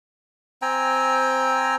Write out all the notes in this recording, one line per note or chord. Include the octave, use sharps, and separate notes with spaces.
C4 G5 G#5 A#5